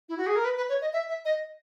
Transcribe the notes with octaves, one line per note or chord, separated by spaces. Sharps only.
E4
F#4
G#4
A#4
B4
B4
C#5
D#5
E5
E5
D#5